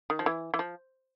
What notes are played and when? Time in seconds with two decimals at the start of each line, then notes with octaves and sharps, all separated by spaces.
0.10 D#3
0.19 F3
0.26 E3
0.54 E3
0.59 F3